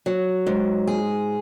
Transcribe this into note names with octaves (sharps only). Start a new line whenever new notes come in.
F#3
G#2
G#4